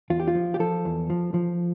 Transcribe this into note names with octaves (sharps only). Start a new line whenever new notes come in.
E2 F4
G4
F4
F3
G4
F3 A4
E2
F3
F3